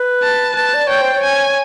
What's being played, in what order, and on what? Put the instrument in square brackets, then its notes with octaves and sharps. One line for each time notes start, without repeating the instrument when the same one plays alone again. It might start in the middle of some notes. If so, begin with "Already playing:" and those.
Already playing: [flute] B4
[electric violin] A5
[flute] B4 [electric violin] A5
[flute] D5
[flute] C#5 [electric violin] G5
[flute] C5
C#5
[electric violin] G#5